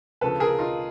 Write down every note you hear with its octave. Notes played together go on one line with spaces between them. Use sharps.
D2 C#3 F3 A4 B4
G#4 A#4
D#4 F4